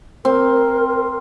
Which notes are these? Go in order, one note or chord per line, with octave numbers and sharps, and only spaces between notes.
C4 A#4